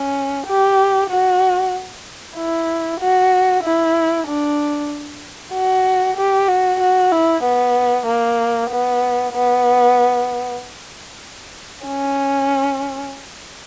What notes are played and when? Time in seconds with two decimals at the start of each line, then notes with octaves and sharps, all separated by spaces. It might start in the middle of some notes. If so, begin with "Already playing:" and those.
Already playing: C#4
0.47 G4
1.10 F#4
2.37 E4
3.00 F#4
3.63 E4
4.27 D4
5.54 F#4
6.17 G4
6.48 F#4
6.80 F#4
7.12 E4
7.44 B3
8.06 A#3
8.70 B3
9.34 B3
11.87 C#4